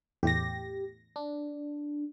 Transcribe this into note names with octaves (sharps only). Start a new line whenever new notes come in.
E2 A2 G4 A#6
D4